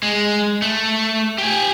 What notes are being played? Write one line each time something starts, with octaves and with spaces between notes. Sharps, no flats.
G#3
A3
G4 G#5